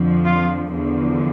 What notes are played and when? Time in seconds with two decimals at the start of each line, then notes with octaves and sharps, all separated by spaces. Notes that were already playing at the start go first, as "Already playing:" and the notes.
Already playing: F2 D3 F3
0.25 F4
0.73 E2 D3 F3